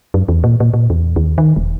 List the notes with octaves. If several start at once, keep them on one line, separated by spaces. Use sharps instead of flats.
F#2
E2
A#2
A#2
A#2
E2
D#2
D#3
E1